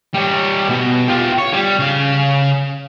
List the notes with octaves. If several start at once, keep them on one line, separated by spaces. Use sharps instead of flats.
G3 C#5
B2 B3
F4 G4
C#5
G3
C#3 F5